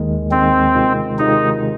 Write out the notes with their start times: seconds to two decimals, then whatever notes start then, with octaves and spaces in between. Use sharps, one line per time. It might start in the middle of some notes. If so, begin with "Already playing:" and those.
Already playing: D#2 D#3 G#3
0.31 D#2 D#3 G#3 C4
0.74 C3 D#3 G#3 F4
1.19 C3 D#3 G#3 D#4 F4